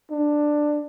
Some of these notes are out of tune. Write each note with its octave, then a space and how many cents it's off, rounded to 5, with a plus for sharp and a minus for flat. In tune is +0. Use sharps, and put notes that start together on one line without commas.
D4 +10